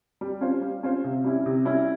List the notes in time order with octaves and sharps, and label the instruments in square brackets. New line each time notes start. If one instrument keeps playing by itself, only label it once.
[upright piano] G3
C#4 F4 C5
G3
C#4 F4 C5
C3
G3 C#4 E4
C3
G3 C#4 E4